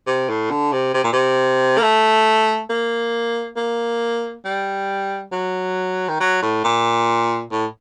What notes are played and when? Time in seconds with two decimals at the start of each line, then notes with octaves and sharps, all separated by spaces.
0.07 C3
0.29 A2
0.51 D3
0.73 C3
0.94 C3
1.04 A#2
1.13 C3
1.78 A#3
1.82 A3
2.70 A#3
3.57 A#3
4.45 G3
5.32 F#3
6.09 D#3
6.20 F#3
6.42 A2
6.64 A#2
7.52 A2